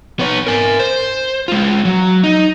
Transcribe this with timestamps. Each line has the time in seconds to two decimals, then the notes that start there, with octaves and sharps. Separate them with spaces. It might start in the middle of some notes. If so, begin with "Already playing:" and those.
0.19 B3 C#5
0.47 A#4 G#5
0.79 C5
1.48 G#3 F4
1.85 F#3
2.23 D#4